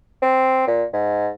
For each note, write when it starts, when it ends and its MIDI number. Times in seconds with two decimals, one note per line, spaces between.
0.22 0.66 60
0.67 0.83 46
0.93 1.29 44